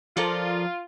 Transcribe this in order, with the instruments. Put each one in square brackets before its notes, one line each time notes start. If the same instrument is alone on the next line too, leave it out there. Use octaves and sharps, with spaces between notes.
[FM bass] F3 [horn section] F4 [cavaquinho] A4 A#4 D5